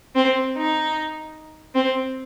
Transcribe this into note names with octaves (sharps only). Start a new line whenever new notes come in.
C4
D#4
C4